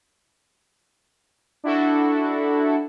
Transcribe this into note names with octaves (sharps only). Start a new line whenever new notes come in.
D4 E4 F#4 A4